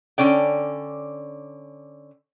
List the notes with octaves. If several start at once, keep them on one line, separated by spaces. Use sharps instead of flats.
D3 C#4 D5 G5